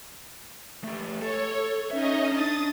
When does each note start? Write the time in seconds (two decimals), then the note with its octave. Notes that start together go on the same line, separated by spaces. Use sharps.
0.84 A3 G4
1.22 A4 C#5
1.91 C#4 D#4 D#5 E5
2.32 D4 D#6 A6